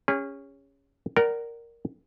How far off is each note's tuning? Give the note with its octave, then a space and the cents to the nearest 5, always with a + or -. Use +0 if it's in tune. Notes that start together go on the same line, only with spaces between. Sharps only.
C#4 +0 G#4 -35
A#4 +0 D5 +0 F#5 +35